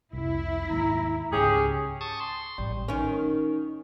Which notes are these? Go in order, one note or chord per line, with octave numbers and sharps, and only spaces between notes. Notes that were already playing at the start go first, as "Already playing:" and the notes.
F1 C2 E4
D#2 G#2 A#5
C#2 G#2 C#4 G4 G#4
A5 C#6 D#6
C6
A1 G3
D#3 C#4